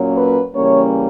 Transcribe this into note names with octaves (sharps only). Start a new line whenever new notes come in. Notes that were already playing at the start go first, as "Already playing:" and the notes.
Already playing: A#2 F#3 A#3 C#4
B4
C#3 E3 G3 A#3 C#4 C#5